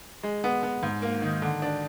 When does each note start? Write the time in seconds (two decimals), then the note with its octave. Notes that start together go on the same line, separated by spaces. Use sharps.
0.23 G#3
0.44 B3
0.63 B3
0.83 G#2
1.02 A#3
1.22 D#3
1.42 D3
1.62 D4